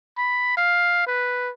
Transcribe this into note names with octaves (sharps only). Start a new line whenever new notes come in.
B5
F5
B4